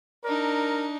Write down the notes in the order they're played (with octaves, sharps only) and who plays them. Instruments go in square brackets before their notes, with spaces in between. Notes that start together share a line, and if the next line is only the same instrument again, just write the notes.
[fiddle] D4 D#4 [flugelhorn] A#4